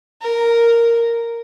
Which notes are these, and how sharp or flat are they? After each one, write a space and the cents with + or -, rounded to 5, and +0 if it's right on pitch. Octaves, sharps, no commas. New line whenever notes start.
A#4 -5